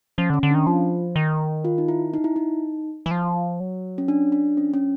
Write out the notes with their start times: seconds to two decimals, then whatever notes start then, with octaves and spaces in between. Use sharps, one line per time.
0.18 F3 C#4
0.30 D3 C#4
0.43 D3 C#4
0.51 D4
0.55 D#3
0.66 F3 F4
1.16 D#3
1.65 F4
1.78 D#4
1.88 E4
2.14 D#4
2.24 E4
2.36 D#4
3.06 E3
3.11 F3
3.60 F#3
3.98 C#4
4.08 D4
4.32 D4
4.57 F3 C#4
4.74 C#4